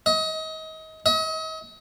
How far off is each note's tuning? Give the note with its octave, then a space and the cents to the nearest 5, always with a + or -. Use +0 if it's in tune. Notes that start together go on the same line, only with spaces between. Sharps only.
D#5 +30
D#5 +40